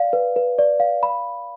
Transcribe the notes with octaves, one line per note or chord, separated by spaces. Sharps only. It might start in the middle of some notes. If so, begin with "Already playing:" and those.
Already playing: D5 F5
B4
B4
D5
F5
B5